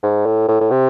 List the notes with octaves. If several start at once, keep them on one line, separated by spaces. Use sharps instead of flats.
G#2
A2
A2
A2
C3